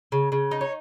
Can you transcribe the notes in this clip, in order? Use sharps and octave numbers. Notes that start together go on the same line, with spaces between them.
C#3
C#3
D#4
C#5